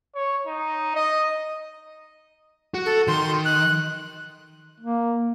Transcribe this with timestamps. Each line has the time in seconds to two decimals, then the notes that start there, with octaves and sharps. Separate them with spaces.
0.15 C#5
0.47 D#4
0.95 D#5
2.74 F#4
2.86 A4
3.08 D#3 C6
3.45 F#6
4.80 A#3